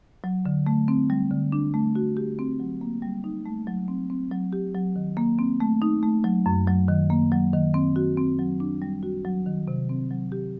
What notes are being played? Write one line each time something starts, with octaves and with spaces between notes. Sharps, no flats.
F#3
D3
A3
C4
G3
D3
D4
A3
F#4
G4
C4
F#3
A#3
G3
D#4
A3
F#3
C4
C4
F#3
G4
F#3
D#3
A#3
C4
A3
D#4
A3
F#3
F#2
F#3
D#3
A#3
F#3
D#3
C4
F#4
C4
F#3
D4
G3
F#4
F#3
D#3
C3
C4
F#3
G4